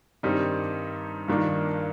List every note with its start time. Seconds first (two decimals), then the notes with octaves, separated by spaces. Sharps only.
0.23 G2 D#3 G3 C4 D#4
1.28 G2 D#3 A#3 D4 F4